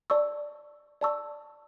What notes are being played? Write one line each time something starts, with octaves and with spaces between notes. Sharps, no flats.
D5 A5 C#6 E6
D5 A5 C#6 E6